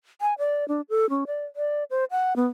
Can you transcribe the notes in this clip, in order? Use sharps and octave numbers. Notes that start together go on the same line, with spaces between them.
G#5
D5
D4
A4
C#4
D5
D5
C5
F#5
B3